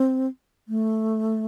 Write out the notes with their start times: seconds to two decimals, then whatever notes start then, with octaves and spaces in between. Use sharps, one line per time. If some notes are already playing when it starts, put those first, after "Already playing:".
Already playing: C4
0.68 A3